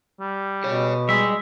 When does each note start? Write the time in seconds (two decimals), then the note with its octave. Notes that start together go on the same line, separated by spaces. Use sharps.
0.20 G3
0.64 B2 G#4 C#5
1.09 G3 G#3 E5